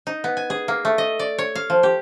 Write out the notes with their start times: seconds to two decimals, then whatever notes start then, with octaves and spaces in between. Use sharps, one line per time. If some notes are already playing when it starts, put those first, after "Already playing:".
0.07 D#4
0.24 B3
0.37 G#5
0.50 G#4
0.68 A#3
0.85 A3
0.98 D#5
1.19 D5
1.38 C#5
1.55 F5
1.70 F3
1.83 G4